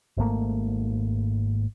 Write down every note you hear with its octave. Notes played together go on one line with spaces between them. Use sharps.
G#1 G#2 A3 A#3